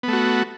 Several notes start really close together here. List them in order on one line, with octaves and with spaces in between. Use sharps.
B3 A3 F#4